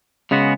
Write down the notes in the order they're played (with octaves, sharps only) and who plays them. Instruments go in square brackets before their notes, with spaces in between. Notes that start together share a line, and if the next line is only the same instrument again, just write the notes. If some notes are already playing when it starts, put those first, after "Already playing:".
[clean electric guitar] C#3 G#3 B3 F#4